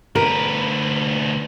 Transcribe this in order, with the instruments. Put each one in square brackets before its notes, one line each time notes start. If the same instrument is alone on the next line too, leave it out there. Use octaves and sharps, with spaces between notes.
[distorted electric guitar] D2 B4 [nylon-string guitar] A#4